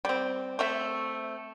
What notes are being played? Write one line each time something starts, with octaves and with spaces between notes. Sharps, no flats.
G3 C4
A3 C4 E5